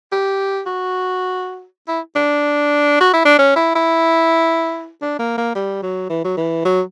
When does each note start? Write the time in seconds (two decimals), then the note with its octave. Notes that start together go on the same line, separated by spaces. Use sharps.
0.12 G4
0.66 F#4
1.88 E4
2.16 D4
3.00 F#4
3.13 E4
3.25 D4
3.39 C#4
3.56 E4
3.75 E4
5.02 D4
5.19 A#3
5.38 A#3
5.55 G3
5.82 F#3
6.10 E3
6.24 F#3
6.37 E3
6.65 F#3